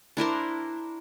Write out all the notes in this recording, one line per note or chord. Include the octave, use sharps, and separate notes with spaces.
D4 E4 A#4 C5